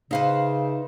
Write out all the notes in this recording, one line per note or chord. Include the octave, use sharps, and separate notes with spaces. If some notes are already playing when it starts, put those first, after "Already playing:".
C#3 D#4 B4 C5 E5 F5